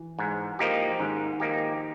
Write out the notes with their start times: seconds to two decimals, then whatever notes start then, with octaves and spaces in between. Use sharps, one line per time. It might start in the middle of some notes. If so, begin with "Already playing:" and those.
Already playing: E3
0.19 G#2
0.59 F3 A#3 D#4 G4
0.99 G#2 D#3
1.40 F3 A#3 D#4 G4